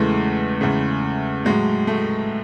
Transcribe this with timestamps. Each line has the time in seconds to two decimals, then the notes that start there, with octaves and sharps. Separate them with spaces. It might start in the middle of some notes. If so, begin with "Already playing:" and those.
Already playing: E2 C#3 E3 G#3 A3
0.61 E2 C#3 G#3
1.45 A2 F#3 G#3
1.87 A3